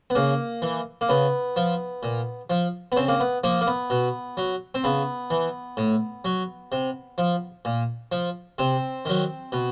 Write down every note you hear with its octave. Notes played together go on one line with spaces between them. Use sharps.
B3
C#3 A#3
E3
A#3
C#3 B3
F3
A#2
F3
B3
C#3 C4
A#3
B3
F3 A#3
A#3
B3
B2
F#3
C4
C#3 B3
E3
A2
F#3
C3
F3
A#2
F3
C3 C4
D#3 F#3
B2